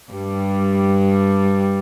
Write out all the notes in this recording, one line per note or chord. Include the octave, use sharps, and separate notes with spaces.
G2 G3